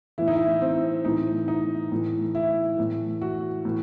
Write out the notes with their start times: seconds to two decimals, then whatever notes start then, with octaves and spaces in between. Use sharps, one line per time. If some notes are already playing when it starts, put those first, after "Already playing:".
0.18 A2 E3 E4
0.28 D#4
0.36 E4
0.61 C4
1.05 A2 E3 D#4
1.48 D#4
1.92 A2 E3
2.35 E4
2.78 A2 E3
3.22 F#4
3.65 A2 E3